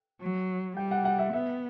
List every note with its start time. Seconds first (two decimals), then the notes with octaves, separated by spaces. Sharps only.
0.21 F#3
0.77 G3 G5
0.91 F#5
1.05 F#5
1.19 E5
1.33 B3 E5